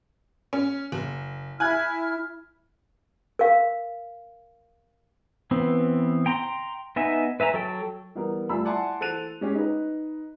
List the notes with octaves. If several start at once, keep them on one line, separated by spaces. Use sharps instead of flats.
C#4
F#1
E4 G#5 F6 F#6 G#6
A#4 F5
E3 B3 C4
G5 A#5 C6
B3 D#4 E5 G#5
B4 E5 G#5 A#5
F#3 A4 G5
E3 G3 B3 A#4
G3 A3 F4 G#5 B5 E6
E4 D5 F#5 G#5 A5 C6
E3 A4 C5 F#6 D#7 F7
G#3 C#4 G4
D#4 B4